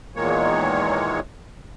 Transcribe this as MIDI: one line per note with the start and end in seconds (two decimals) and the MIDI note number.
0.16 1.20 40
0.16 1.20 46
0.16 1.20 51
0.16 1.20 56
0.16 1.20 58
0.16 1.20 73